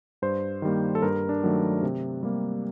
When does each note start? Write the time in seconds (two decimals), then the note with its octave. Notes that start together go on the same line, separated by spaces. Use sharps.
0.22 G2 C5
0.62 D#3 G3 A#3
0.95 A4
1.02 G2 A#4
1.29 D4
1.43 D#3 F#3 A3
1.83 C3
2.23 G3 A#3